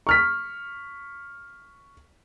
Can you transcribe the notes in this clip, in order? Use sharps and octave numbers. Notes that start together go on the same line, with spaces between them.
C#6 F6 B6